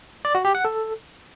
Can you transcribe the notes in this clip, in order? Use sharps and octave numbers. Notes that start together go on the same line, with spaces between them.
D5
F#4
G4
F#5
A4